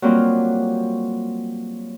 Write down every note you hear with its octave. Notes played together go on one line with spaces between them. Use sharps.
F#3 G3 A#3 C4 F4